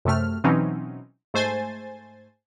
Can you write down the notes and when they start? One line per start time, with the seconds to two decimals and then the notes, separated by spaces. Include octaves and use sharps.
0.05 F#2 C3 A3 F6
0.44 B2 E3 F#3 C4 C#4 D#4
1.34 G#2 A3 C5 G#5 A6